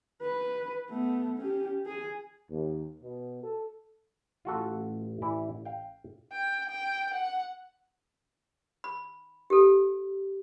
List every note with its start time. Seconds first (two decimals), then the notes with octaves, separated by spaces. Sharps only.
0.22 B4
0.89 A3 B3
1.38 C#4 G4
1.86 G#4 G#5
2.50 D#2
3.01 B2
3.43 A4
4.45 A1 F4 F#4 A4
5.22 E3 E4 D5
5.65 F5 G5
6.32 G5
6.69 G5
7.14 F#5
8.84 B5
9.50 G4 A4